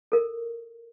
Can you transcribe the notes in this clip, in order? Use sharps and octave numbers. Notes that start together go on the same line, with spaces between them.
A4 A#4